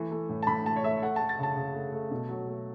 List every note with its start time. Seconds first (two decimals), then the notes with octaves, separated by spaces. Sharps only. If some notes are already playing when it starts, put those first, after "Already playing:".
Already playing: E3 A3
0.11 A3
0.29 A2
0.43 A5
0.47 A2 B5
0.66 A3 A5
0.76 C#5
0.83 A3 E5
1.02 A3 F#5
1.16 A3 A5
1.29 A6
1.39 C#3 A5
1.56 C#3
1.74 A3
1.93 A3
2.11 B2
2.29 F#3
2.48 A3